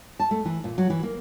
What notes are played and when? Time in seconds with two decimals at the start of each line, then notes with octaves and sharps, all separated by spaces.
0.20 A5
0.31 A3
0.45 E3
0.64 A#2
0.78 F#3
0.90 E3
1.03 A#3